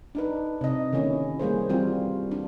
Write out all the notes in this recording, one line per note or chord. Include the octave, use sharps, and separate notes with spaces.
D4 D#4 B4
C3 D#5
D3 D#3 A#3 C#4 E4
G3 A#3 G#4 C5
E3 G3 C4 F4 F#4
D4